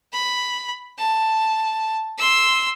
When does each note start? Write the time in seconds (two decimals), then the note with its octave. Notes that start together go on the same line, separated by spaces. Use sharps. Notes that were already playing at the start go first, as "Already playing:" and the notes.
0.13 B5
0.98 A5
2.18 C6 E6